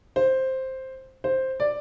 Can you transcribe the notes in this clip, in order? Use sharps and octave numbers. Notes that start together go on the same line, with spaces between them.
C5
C5
D5